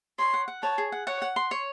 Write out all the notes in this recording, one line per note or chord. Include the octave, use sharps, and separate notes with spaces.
C#5 C6
F#5
F#5
C#5 A5
G#4
F#5
C#5 F#5
F#5
C6
C#5